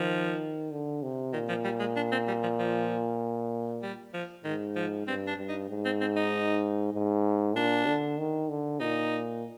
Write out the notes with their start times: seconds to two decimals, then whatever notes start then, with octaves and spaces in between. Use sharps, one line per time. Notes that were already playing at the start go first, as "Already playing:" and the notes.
Already playing: D#3 F3
0.71 D3
1.03 C3
1.33 A#2 D#3
1.49 F3
1.64 G3
1.80 G#3
1.96 D4
2.12 C4
2.27 G3
2.43 F3
2.59 F3
3.83 G3
4.14 F3
4.44 G#2 D#3
4.76 F3
5.07 G2 C4
5.27 D4
5.38 G2
5.49 D#4
5.70 G#2
5.85 C4
6.01 C4
6.16 D#4
6.94 G#2
7.56 A#2 D4
7.87 D3
8.18 D#3
8.49 D3
8.80 A#2 D#4